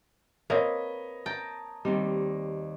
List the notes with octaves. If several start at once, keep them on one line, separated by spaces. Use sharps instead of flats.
A#3 C4 B4 C#5 D#5
G5 A5 A#5
D#2 G3 C4 D#4